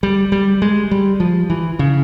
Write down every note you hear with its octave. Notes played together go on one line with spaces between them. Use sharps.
G3
G3
G#3
G3
F3
E3
C#3